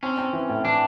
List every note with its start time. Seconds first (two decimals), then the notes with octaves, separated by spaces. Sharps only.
0.03 C4 C#4
0.18 C4
0.33 E3
0.49 A2
0.64 E3 D4